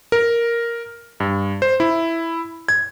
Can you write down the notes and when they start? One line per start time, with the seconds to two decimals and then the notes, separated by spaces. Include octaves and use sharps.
0.12 A#4
1.20 G2
1.62 C5
1.80 E4
2.68 G#6